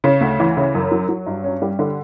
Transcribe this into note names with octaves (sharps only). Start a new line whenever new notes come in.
C#3
D2
E3
C#3
F#2
F#3
F#3
G2
C#4
G3
D3